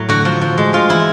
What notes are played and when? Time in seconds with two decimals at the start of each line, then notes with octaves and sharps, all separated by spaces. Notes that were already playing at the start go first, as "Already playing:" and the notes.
Already playing: A2 F#3
0.09 D3 F#4
0.25 F3
0.41 F3
0.58 G#3
0.73 G#3 F4
0.89 E3 E4